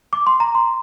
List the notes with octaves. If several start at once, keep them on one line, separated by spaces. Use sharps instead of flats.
D6
C6
A#5
C6